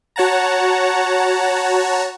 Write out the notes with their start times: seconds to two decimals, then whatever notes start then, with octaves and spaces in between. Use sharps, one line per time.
0.16 F#4 C#5 F#5 A5 A#5